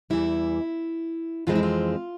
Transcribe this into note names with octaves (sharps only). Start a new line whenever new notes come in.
E2 E3 G3 E4
F2 E3 G#3 C4 F4
E4
F4